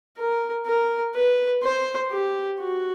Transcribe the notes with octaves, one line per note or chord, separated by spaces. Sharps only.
A#4
A#4
B4
C5
G4
F#4